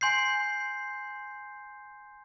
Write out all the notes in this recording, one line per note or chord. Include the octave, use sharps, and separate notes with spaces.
G#5 C6 G6 C7